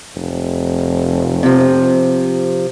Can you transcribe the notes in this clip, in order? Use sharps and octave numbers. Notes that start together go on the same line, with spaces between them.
F1
C3 F3